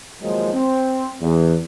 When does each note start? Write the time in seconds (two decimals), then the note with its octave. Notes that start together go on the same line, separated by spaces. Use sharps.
0.21 D#2 D#3 F3 F#3 G#3
0.53 C4
1.20 E2